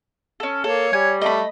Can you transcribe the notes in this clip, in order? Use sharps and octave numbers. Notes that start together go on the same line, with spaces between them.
C#4 A4
A#3 A4 C#5
G3 G#5
A3 D#5 E5 B5